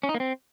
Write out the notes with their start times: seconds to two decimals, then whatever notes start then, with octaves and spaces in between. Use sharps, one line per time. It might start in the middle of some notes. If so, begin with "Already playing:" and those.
0.03 C#4
0.09 D#4
0.14 A#3
0.20 C4